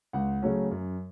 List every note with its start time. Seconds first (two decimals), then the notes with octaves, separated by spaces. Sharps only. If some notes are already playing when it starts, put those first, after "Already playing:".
0.13 C#2 F#5
0.42 C#3 F#3 A3 C#4
0.71 F#2